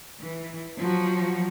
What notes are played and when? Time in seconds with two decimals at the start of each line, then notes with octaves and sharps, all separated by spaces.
0.20 E3
0.78 F3 F#3 F#4